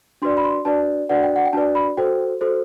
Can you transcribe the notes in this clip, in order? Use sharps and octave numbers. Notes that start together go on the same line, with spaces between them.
D4 F#4 B4 D5 C6
B5
C6
D4 F#4 B4 D5 A5
D4 F#4 B4 D5 F#5
G5
F#5
G5
D4 F#4 B4 D5 A5
B5
F#4 A4 C5 G5
F#4 A4 C5